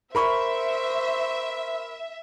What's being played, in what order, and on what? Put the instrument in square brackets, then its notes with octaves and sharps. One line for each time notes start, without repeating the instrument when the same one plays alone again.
[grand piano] A#4 B5 C#6 [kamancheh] C5 [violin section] E5